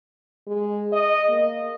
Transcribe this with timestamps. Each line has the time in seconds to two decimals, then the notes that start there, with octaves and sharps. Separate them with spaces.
0.47 G#3
0.92 D#5
1.29 A#3